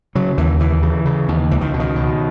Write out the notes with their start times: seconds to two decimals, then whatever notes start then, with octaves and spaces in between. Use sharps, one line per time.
0.15 C#3 F#3
0.38 D#2 E3
0.60 D#2 E3
0.83 C#3
1.05 C#3
1.28 D#2
1.51 C#2 E3
1.61 D#3
1.74 B2
1.80 D#3
1.96 B2